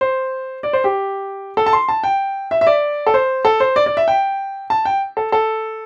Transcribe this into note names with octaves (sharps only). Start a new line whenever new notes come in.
C5
D5
C5
G4
A4
A5
C6
A5
G5
E5
E5
D5
A4
C5
A4
C5
D5
D5
E5
G5
A5
G5
A4
A4